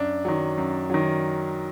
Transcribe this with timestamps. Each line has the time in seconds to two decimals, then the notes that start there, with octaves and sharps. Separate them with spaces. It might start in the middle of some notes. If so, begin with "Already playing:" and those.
Already playing: F#2 D4
0.25 D#3 F#3
0.58 F#2
0.90 D#3 F#3